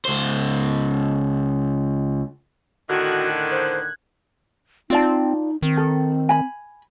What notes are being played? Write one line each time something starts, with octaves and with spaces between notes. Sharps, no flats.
C#2 C5
A2 D3 D#3 F#4 F#6 G#6
C5
C4 D#4 F4 D5 A5
D#3 C4
A4
G#5 B5